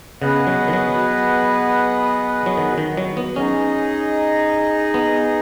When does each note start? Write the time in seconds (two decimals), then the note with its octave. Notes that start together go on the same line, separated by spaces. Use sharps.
0.22 C#3 B3 G#4 B4 D#5 F#5
0.47 F#3
0.68 D#3
0.73 F#3
2.46 F#3
2.57 D#3
2.78 D#3
2.97 F#3
3.17 B3
3.36 C#4 D#4 G#4 D#5
4.94 B3